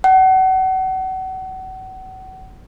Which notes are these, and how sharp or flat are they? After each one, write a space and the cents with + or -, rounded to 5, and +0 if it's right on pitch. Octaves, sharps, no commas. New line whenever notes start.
F#5 +35